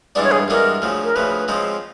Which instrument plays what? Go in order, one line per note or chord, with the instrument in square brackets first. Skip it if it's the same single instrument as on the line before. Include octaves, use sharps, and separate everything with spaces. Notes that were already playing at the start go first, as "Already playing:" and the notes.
[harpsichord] G2 E3 G#3 B3 D4 [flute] D5
[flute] C#5
G#4
[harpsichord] G2 E3 G#3 B3 D4 [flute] A#4
[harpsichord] D2 C#3 F3
[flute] A#4
[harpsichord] D2 C#3 F3 [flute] B4
[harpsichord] C#3 F3 G#3 C4